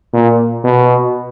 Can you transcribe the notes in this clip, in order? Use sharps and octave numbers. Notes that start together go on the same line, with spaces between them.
A#2
B2